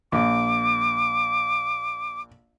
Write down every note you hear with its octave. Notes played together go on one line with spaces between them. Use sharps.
A#1 D6